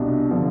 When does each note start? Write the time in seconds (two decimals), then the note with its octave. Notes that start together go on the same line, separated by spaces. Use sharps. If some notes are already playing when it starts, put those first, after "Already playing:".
Already playing: C2 B2 D4
0.31 D3 F3